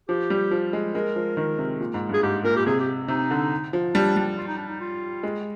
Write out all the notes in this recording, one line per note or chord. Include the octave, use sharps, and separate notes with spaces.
F3 G4
G3
F3
G#3
G#3 A#4
F3
D#3
C3
A#2
G#2
G2 G#4
G#2 G4
A#2 A#4
G4
C3 G#4
G4
C3 D#4
D3
F3
G3 D4
G3
F4
D#4
D4
D#4
F4
G#3